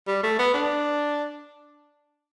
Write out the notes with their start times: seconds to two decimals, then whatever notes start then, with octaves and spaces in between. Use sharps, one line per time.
0.07 G3
0.23 A3
0.39 B3
0.54 D4